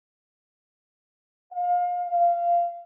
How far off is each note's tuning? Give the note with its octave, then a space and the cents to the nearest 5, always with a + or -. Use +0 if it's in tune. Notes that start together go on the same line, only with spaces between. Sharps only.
F5 +25
F5 -15